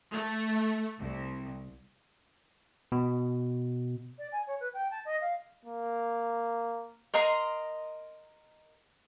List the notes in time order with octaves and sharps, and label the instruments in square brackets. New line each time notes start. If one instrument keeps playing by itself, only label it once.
[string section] A3
C2
[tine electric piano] B2
[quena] D5
G#5
C#5
B4
G5
A5
D#5
F5
[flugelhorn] A#3
[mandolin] A#4 D#5 A#5 C6